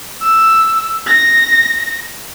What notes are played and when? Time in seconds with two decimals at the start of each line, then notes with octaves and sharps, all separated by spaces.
0.21 E6
1.07 A#6